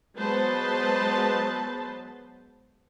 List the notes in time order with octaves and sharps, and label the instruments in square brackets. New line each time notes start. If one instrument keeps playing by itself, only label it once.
[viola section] F#3 G#3 B3 B4 C5 A5